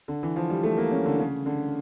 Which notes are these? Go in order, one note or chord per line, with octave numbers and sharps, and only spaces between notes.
D3
E3
F3
G3
A3
A#3
C#4
D3
C#3
D3